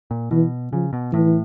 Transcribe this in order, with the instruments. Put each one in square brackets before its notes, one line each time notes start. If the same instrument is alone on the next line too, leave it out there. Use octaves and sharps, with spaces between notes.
[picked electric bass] A#2
[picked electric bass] B2 [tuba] E3
[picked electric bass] C#3 [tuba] F3
[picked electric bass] B2
[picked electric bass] A2 [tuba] E3